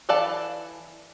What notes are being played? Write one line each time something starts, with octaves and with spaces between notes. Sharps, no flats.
E3 A4 D5 F5 A5